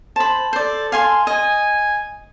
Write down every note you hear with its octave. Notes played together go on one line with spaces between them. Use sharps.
C5 A5 B5
A4 C5 D5
F5 G#5 C6
D#5 G#5